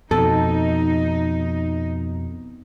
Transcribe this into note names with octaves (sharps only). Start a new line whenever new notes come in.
F2 B2 D#4 A4